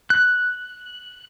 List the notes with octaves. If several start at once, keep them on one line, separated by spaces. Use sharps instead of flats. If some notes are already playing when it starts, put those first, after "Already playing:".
F#6